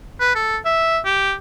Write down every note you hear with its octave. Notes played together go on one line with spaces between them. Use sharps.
B4
A4
E5
G4